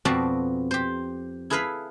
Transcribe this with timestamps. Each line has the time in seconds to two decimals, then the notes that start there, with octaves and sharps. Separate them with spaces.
0.05 F2 B2 C4 F#4 D5 A5
0.71 G4 C5
1.50 E4 G#4 A4 B4 F5 B5